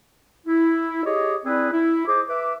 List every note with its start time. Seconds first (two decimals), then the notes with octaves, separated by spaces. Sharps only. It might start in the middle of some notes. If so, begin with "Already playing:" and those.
0.47 E4
1.05 G4 G#4 C#5 D#5
1.45 C4 E4 G#4 B4 D5
1.72 E4
2.07 G#4 C5 D#5 D6
2.29 B4 E5 D6